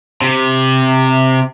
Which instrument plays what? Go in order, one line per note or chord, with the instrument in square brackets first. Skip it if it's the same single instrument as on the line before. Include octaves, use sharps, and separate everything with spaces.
[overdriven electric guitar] C3